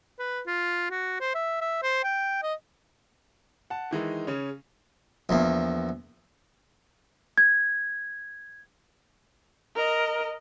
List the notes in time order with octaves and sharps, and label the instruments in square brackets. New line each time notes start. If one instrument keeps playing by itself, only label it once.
[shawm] B4
F4
F#4
C5
E5
E5
C5
G5
D#5
[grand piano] F#5 A5
D#3 E3 G#3 D#4
C#3 C#4
[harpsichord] A#1 E2
[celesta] G#6
[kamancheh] A#4 D#5